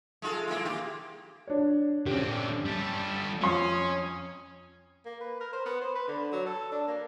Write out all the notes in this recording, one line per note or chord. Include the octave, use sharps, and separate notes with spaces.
G#3 F4 A4
A#3 E4 F4
F4 G4
D4 C#5
D3 C4 C#4 G4
G3 A4
F2 C#4 C6 D#6
A#3
B4
A#4
C5
B3
C5
B4
D3
F#3
A4
D4
A#3